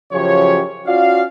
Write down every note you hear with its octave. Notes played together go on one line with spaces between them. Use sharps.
F#2 C#3 F3 G4 C#5
C#4 F4 F#4 D5 F5